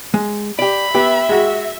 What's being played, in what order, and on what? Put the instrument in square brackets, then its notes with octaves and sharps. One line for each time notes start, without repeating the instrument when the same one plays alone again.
[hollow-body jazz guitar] G#3
[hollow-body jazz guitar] G4 D5 [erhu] B5
[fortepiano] B3 [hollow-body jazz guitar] G4 [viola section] E5
[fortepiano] G#3 F#4